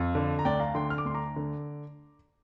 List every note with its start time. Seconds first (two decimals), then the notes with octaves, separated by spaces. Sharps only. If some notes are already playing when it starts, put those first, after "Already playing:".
Already playing: F2
0.15 D3
0.39 A#5
0.45 D2 D5 G5
0.60 F5 A#5
0.75 D3 G5 C6
0.90 F6
0.98 D6
1.05 D2 C6
1.14 A#5 D6
1.36 D3